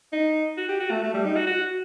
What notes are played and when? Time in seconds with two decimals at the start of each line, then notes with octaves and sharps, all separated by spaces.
0.13 D#4
0.57 F#4
0.69 G4
0.80 F#4
0.91 A3
1.03 A3
1.14 G3
1.24 D#4
1.36 F#4
1.47 F#4